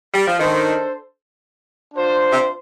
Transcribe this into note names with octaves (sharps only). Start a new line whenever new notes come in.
G3
F3
D#3 D4 A4 C5
D4 F4 C5
C3